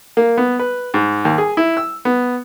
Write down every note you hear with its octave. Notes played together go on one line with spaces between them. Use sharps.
A#3
B3
B4
G#2
D#2
G#4
E4
E6
B3